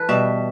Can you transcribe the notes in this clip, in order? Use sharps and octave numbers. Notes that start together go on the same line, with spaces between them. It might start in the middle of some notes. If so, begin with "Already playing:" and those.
Already playing: E3 A4 B4
B2 G3 E5